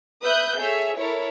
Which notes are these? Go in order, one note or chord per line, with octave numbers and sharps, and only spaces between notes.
B4 E5 D#6 F#6 G6
G#4 A4 C#5 E5
E4 A4 A#4 C#5